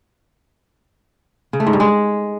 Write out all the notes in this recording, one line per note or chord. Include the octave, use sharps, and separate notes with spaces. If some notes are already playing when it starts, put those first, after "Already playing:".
C#3
A3
G#2
G2
G#3